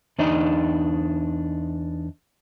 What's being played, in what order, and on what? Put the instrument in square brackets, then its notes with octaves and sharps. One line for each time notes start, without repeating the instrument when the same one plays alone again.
[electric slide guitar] E2 D4 D#4 D#5